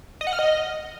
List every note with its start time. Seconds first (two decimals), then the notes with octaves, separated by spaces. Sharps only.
0.21 D#5
0.27 F#5
0.33 F6
0.39 D#5